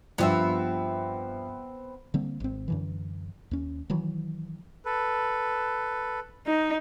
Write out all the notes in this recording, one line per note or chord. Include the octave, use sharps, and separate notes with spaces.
G2 F3 B3 C4 E5
D3 G3 A#3 C4
G#1 C4
F#2 D3 E3
D#2 C#4
D#3 E3 F#3
A4 B4
D#4